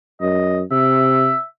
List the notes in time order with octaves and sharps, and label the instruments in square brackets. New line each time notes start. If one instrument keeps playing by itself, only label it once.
[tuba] F#2 [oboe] D#5
[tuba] C3 [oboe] E5